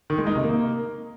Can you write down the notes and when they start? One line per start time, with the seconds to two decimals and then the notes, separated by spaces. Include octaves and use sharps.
0.10 D#3
0.18 G#3
0.27 D#4
0.35 C3
0.43 A#3